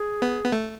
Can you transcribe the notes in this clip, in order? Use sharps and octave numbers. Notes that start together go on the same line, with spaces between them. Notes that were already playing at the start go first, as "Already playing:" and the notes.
Already playing: G#4
B3
B3
A3